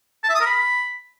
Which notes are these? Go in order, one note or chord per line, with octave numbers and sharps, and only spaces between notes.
A5
E5
D#6
A#4
B5